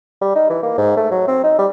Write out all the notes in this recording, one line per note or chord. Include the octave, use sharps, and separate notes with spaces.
G3
D#4
E3
A#3
G#2
A3
F#3
C4
D#4
G3